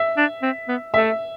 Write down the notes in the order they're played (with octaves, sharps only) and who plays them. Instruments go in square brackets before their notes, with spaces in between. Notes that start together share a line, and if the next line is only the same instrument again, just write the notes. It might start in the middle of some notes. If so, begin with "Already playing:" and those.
Already playing: [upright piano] E5
[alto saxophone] D4
C4
B3
[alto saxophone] A3 [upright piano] E5